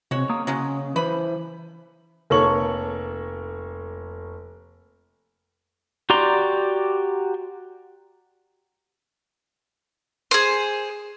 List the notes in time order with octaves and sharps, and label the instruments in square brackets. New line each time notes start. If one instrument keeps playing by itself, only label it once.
[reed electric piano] C3 C4 [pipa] G#3 F#4 C#5
[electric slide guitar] A#3 A#5 [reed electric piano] D#6
[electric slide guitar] C#3 [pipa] F#3 G#3 C#4
[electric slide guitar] E3 C5 [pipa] B4 B5
[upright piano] F1 A#3 A4 C#5 C#6 F#7
[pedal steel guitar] F#4 G4 D5 A#5 C6
[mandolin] G#4 C5